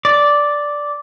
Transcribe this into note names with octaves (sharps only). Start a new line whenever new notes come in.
D5